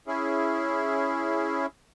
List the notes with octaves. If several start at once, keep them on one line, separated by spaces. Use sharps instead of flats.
C#4 E4 G#4